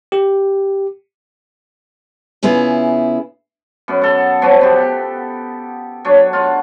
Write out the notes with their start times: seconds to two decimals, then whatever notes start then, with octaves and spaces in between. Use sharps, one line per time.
0.12 G4
2.43 C#3 B3 E4 F4 G#4
3.88 F#2 B3
4.02 A4 F#5
4.42 F3 F#3 B3 F#4
4.61 B3 G4
6.05 F#3 D4 C#5
6.33 F4 F#5